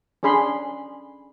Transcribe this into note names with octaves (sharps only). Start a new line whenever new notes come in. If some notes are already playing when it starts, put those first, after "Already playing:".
C#4 D4 G#4 B5 C6